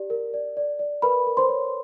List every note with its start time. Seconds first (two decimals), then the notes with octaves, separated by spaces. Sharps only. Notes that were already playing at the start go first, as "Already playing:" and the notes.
Already playing: G4 D5
0.10 A#4
0.34 D5
0.57 D5
0.79 D5
1.02 A#4 B4 B5
1.27 A#4
1.37 C5 C6
1.49 C#5